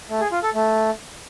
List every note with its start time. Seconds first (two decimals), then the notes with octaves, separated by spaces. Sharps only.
0.09 A3
0.21 G#4
0.32 F4
0.43 A4
0.54 A3